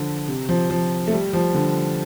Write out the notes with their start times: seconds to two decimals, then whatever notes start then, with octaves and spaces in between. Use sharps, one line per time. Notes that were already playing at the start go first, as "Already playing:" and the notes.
Already playing: D3 F3
0.28 C3
0.49 F3
0.70 F3
1.07 A3
1.12 G3
1.33 F3
1.54 D3